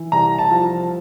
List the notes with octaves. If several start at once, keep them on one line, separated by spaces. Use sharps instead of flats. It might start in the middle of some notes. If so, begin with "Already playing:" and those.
Already playing: E3
C2 A#5
A5
F3